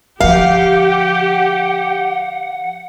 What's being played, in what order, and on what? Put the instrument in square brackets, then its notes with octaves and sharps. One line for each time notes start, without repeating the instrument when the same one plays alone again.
[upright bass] D3 F3 [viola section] G4 [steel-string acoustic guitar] F5 [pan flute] F#5